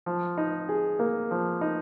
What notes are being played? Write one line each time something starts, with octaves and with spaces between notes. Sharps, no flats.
F3
D#4
G#4
A#3
F3
D#4